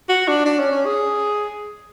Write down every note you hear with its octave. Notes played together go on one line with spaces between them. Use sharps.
F#4
D4
D4
C#4
C#4
G#4